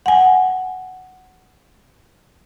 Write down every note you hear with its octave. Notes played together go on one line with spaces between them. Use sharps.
F#5 G#5